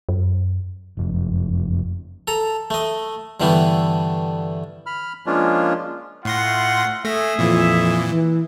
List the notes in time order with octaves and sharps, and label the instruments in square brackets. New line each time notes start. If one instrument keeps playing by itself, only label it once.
[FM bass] F#2
[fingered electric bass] F#1 F2
[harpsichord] A4 A#5
A3 D#5
G2 D3 E3 G3 A3 B3
[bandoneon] B5 F6
F3 G#3 A#3 C#4 D4 F4
[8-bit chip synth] A2 C6 A#6 [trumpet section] A3 F4 F#5
[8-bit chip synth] A3 A#6 [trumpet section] G#4 E5
[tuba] F2 [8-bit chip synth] A#2 E3
[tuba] E3